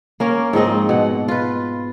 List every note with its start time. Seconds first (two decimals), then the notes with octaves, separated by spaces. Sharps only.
0.20 A#3 C#4 A#4
0.53 G#2 F3 C4 D#5
0.89 B2 F#5
1.28 F4 B4